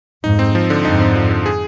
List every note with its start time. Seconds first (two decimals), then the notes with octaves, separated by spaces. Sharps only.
0.24 F2 G#2 D#4
0.39 C4
0.55 F3
0.70 D3
0.85 F2 G#2 D#4
1.00 C4
1.16 F3
1.31 D3
1.46 G#4